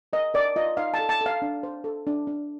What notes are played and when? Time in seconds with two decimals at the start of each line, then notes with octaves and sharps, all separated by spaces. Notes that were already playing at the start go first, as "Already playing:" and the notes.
0.13 A#4 D#5
0.34 A#4 D5
0.56 F4 D#5
0.77 D#4 F5
0.94 A5
0.99 A4
1.09 A5
1.21 A4
1.26 F5
1.42 D4
1.63 C5
1.84 A4
2.07 D4
2.27 D4